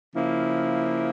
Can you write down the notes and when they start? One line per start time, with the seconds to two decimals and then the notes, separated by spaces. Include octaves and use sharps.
0.14 C#3 F3 A#3 E4